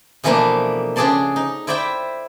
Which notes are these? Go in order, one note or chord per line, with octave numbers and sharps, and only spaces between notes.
B2 E3 F3 A3 A#3 D4
C#3 D4 G#4 D5 A5 C6
D#4
E4 C5 D5 E5 G5